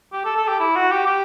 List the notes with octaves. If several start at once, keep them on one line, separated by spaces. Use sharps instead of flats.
G4
A4
A4
G4
E4
F#4
G4
G4